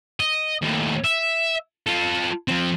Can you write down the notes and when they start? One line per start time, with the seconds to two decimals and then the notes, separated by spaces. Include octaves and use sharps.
0.20 D#5
0.62 D#2 A2
1.04 E5
1.87 F4 A4
2.48 F3 C4